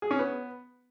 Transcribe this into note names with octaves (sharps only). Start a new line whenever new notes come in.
G#4
C#4
B3